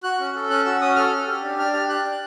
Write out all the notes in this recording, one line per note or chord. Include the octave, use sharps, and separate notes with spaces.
F#4 F#6
C#4
A4
C#4 F#6
F#4 E6
C#4 D#6
A4 F6
C#4
G4
D4
D4 F6
G4 F6
G4 F#6
D4